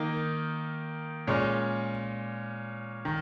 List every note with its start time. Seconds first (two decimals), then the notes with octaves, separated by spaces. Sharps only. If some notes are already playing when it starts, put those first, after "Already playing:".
Already playing: D#3 A#3 D#4
1.27 A#2 G#3 C#4
3.05 D#3